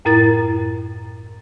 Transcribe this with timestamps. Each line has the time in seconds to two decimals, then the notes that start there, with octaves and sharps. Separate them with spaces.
0.05 F#2 A2 E4 A#4 A#5 A6